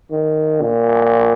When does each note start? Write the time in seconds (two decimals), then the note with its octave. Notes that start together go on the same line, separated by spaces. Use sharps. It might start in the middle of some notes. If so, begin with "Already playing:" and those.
0.11 D#3
0.62 A#2